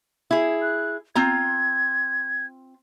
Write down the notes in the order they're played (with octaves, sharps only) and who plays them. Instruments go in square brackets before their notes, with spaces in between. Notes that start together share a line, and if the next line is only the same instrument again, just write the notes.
[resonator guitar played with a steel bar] E4 G#4
[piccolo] F#6
[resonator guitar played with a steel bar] C4 F4 A#5 [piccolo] G#6